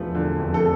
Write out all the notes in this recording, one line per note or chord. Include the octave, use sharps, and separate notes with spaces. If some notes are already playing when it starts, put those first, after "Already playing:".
Already playing: E1 F3 A3 B4
D3
F2
A4